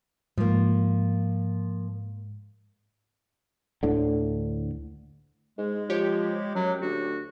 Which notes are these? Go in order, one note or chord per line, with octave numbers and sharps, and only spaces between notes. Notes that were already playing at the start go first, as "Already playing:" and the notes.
G#2 F3 A#3
D2 A2 D3
G#2 G#3
F3 G4 C#5
F#2 F#3
D2 F#4